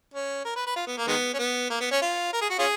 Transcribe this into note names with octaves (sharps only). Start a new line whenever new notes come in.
C#4
A#4
B4
B4
F4
B3
A#3
D#3 G#3 B3
C#4
B3
A#3
B3
C#4
F4
A#4
G#4
F#4
C#4 F4 G#4